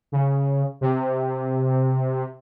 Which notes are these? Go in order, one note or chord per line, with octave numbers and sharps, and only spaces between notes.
C#3
C3